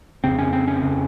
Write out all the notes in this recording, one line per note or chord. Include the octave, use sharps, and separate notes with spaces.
F2 C#3 C4
C#4
C4
C#4
F2 C#3